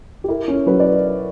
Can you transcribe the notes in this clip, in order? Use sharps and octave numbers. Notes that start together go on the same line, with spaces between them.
G4
E4 A#4
C#4
F#3 B4
D5